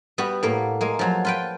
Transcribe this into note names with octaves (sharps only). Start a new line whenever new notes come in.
G3 B3 F#4
A2 A#3
G#3 A#3
F3 F#3
F4 B4 G5